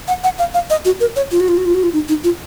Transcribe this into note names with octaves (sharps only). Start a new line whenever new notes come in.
F#5
F#5
F5
F5
D#5
F#4
A#4
C#5
F4
F#4
F4
F#4
F4
F#4
F4
D#4
D#4
F4